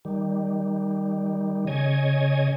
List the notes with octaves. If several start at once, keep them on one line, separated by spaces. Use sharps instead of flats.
D#3 G3
C#3 C#5 D#5 G#5